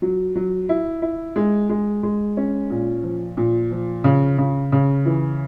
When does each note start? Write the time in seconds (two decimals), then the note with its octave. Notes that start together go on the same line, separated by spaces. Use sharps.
0.02 F#3
0.35 F#3
0.69 E4
1.02 E4
1.36 G#3
1.69 G#3
2.03 G#3
2.37 C#4
2.70 A#2
3.04 F3
3.37 A#2
3.71 F3
4.04 C#3
4.38 C#3
4.72 C#3
5.05 E3